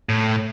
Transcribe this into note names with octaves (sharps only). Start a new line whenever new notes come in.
A2